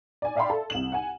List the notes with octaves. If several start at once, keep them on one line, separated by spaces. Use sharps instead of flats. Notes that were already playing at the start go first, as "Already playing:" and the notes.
D5 G#5
D5 E5 F5 G5 B5 C6
A4
C2 E7 F#7
F#5 G#5